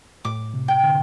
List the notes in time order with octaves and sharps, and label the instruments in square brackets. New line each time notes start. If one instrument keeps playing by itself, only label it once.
[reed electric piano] A2 [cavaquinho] D6
[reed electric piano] C3
[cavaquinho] G5
[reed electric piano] D3